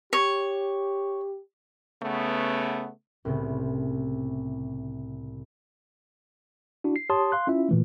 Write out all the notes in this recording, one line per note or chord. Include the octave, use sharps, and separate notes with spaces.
G4 C#5
C#3 A3 B3
C2 A2 C#3 B3 C4
D4 E4 F#4
C7
G4 C#5 A5 C6 D#6
F5 C6 F#6
C#4 E4 F4 E5
A#2 E3 A3